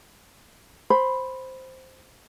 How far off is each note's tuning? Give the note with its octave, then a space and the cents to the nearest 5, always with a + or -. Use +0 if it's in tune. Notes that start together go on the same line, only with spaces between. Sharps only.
C5 +0 B5 +0